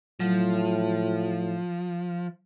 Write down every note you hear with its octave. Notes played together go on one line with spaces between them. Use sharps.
A2 F3 F#3